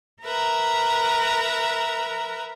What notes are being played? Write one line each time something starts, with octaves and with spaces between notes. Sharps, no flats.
A#4 B4 E5 A#5